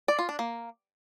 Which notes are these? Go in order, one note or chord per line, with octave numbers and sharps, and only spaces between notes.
D5
F4
D4
A#3